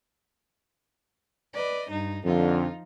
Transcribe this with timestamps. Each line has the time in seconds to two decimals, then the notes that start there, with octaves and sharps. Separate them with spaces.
1.53 B4 D5 D#5
1.91 G2 D#4
2.25 F2 D3 F3 D#4 F4